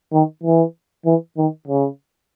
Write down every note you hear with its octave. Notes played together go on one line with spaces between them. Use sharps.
D#3
E3
E3
D#3
C#3